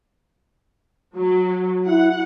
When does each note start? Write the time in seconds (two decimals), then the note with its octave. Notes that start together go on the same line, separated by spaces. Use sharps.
1.16 F#3
1.87 E4 F#5